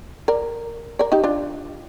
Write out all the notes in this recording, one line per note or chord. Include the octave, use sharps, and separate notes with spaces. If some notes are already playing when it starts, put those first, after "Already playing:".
A#4 D5
A#4 D5
D#4 G4
D4 F4